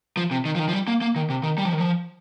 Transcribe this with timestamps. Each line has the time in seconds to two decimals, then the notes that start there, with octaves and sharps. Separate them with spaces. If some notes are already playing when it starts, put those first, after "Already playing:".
0.17 F3
0.31 C3
0.45 D#3
0.55 F3
0.59 D#3
0.69 F3
0.73 G3
0.88 A#3
1.01 A#3
1.16 D#3
1.30 C3
1.43 D#3
1.58 G3
1.65 F3
1.73 D#3
1.80 F3